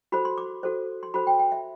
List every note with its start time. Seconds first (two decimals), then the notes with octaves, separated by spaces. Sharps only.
0.12 F#4 A4 C5 B5
0.25 C6
0.38 D6
0.63 F#4 A4 C5
1.03 C6
1.14 F#4 A4 C5 B5
1.27 G5
1.39 G5
1.52 E5